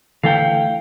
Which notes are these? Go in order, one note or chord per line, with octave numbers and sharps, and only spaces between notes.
D3 E3 A3 F5 G5